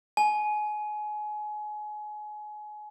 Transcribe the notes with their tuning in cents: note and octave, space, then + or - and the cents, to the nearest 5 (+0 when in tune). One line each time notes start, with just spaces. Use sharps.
G#5 +25